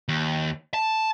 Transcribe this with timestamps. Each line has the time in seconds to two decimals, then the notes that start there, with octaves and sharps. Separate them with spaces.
0.08 D#2
0.74 A5